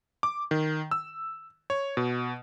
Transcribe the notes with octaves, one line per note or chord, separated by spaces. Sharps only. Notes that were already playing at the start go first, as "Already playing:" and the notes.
D6
D#3
E6
C#5
B2